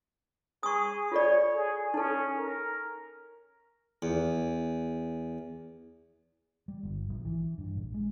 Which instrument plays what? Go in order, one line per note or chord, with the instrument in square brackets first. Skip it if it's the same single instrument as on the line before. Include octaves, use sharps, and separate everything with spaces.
[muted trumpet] G#4 [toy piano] C#6 D#6
[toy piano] F4 A4 D5 [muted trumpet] C#5
[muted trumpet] G#4
[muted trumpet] C#4 [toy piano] D#4 A4
[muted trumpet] A#4
[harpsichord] E2
[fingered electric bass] G3
G1
A#1
E3
G2
A#1
G#3